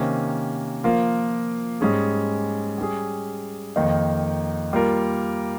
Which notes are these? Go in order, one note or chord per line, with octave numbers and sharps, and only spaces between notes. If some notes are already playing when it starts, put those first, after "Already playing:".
Already playing: C3 D#3 A#3 C#4
F3 A#3 F4 A#4
G#2 G3 C#4 G#4
G3 C#4 G#4
F2 D#3 A#3 D#4
G3 A#3 F4 A#4